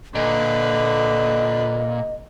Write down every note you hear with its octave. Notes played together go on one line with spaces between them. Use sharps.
A#2 D3 B4 D#5